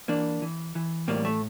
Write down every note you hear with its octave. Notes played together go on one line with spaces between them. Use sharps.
E3 A#3 D4
E3
E3
A2 G3 A#3
A3